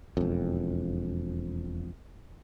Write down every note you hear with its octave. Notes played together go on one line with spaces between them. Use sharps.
E1 F2